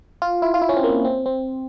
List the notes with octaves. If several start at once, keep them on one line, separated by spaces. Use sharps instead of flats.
F4
E4
F4
E4
C#4
C4
A#3
C4
C4